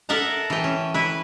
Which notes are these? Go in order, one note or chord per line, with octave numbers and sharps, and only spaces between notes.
A4 A#4 E5 F#5 A5 A#5
E3 G5
C#4
E4 B4